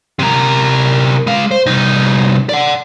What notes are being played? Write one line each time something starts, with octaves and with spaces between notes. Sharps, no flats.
C3 A#4
G#3 F5
C5
C2 D#4
D5 F#5